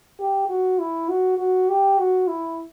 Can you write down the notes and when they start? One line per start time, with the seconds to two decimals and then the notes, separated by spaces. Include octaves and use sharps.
0.20 G4
0.49 F#4
0.79 E4
1.09 F#4
1.38 F#4
1.69 G4
1.98 F#4
2.27 E4